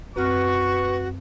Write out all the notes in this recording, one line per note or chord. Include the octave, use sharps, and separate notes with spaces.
F#2 C4 F#4 B4 C#6 F6